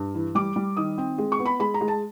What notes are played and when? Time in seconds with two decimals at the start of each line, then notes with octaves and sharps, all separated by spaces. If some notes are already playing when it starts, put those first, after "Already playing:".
Already playing: G2
0.14 E3
0.35 G3 D6
0.56 G3
0.77 D#3 D#6
0.98 C4
1.18 G#3
1.32 C#6
1.39 B3
1.46 B5
1.60 G#3 B5
1.74 A#5
1.81 G#3
1.88 A5